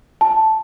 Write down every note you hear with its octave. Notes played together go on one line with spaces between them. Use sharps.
A5